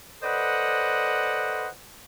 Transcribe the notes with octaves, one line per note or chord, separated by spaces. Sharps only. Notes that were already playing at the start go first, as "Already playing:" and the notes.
A4 B4 C5 D5 D#5 F#5